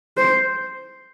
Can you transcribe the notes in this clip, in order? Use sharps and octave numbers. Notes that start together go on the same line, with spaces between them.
C5